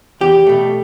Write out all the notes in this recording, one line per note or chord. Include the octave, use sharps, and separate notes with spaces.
E2 G4
B2 A3